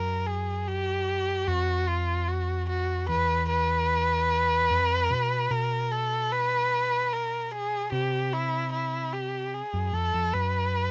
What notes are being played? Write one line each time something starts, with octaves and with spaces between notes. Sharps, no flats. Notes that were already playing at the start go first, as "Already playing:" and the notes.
Already playing: F#2 A#4
G#4
G4
F2 F#4
F4
F#4
F#4
E2 B4
B4
F2
B2
B2 A#4
A4
B4
A#4
G#4
C3 G4
E4
E4
G4
G#4
F#2
F2 A4
F2
F#2 B4